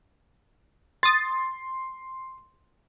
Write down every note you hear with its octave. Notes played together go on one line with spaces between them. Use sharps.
C6 D#6 A6